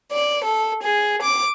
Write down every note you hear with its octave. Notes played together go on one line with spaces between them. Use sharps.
D5
A4
G#4
D6